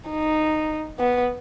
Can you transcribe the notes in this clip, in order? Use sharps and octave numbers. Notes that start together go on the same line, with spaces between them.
D#4
B3